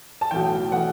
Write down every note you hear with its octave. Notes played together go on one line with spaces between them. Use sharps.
A5
B1 A2 E3 G5
A2 E3 F#5